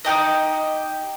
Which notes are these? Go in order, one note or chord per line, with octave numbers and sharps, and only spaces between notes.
D#4 F#4 G4 D#5